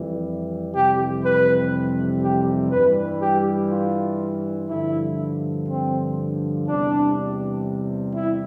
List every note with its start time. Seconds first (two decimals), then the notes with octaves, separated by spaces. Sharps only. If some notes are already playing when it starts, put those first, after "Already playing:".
Already playing: F2 E3 G3
0.74 F2 C3 E3 G3 G4
1.24 B4
2.23 G4
2.71 G2 E3 G3 B4
3.21 G4
3.70 F4
4.69 G2 D3 F3 E4
5.68 C4
6.67 E2 C3 G3 D4
8.15 E4